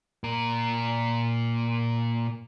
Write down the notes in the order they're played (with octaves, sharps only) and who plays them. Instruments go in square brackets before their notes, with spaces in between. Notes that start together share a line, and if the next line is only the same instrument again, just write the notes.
[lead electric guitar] A#2 A#4